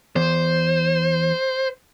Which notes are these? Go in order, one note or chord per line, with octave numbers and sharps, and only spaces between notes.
E2 C5